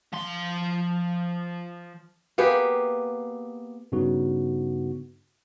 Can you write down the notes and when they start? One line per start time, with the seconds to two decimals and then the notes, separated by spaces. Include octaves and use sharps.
0.12 F3 C6
2.38 A#3 B3 G4 G#4
3.92 G2 C#3 B3 D#4 F#4